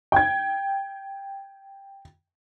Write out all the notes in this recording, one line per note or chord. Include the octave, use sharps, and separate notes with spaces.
G5 G#6